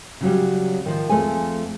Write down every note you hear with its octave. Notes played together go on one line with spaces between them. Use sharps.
C#3 F#3 G3
D#3 F3
F2 A2 F3 A3 G#4 G#5